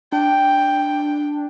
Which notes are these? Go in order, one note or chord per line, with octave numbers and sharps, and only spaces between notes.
D4 G5